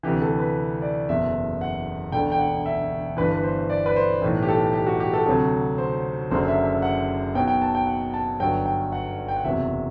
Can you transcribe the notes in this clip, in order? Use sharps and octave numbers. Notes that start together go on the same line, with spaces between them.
D2 C3 E3 G4
A4
B4
D5
F#1 E2 B2 E5
F#5
E1 D2 D3 G5
G5
F#5
E5
G1 G2 E3 B4
B4
C5
D5
B4
C5
B1 A2 E3
G4
A4
G4
F#4
G4
A4
D2 C3 F#3 A4
C5
F#1 F#2 D3 F#3 C5
E5
E5
F#5
B1 B2 F#3 G5
G5
A5
G5
F#5
A5
G1 G2 F#3 G5
G5
F#5
G5
F#5
F#1 E2 C3 F#3 E5